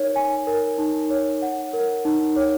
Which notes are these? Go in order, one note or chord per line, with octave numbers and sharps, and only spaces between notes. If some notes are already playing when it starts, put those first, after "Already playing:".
Already playing: D#4 A#4 C#5
G#5
A#4
D#4
C#5
F#5
A#4
D#4
C#5